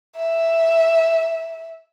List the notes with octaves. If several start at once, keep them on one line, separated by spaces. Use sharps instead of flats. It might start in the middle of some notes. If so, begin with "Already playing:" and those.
E5